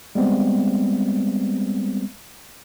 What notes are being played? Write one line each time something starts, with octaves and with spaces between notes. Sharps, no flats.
G3 G#3 B3 C4